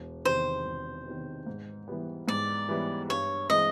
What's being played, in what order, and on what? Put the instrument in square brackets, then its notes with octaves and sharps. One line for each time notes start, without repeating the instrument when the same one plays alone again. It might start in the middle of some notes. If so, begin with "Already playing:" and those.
Already playing: [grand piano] E1
[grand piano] E2 C3 D#3 [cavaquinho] C5
[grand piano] E1
E2 C3 D#3
G#2
E3 G3 B3
[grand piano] G#2 [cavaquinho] D5
[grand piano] E3 G3 B3
[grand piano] G2 [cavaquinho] C#5
[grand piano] E3 G#3 C4 [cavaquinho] D#5